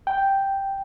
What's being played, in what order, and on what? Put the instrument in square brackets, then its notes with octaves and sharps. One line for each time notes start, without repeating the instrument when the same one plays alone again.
[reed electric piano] G5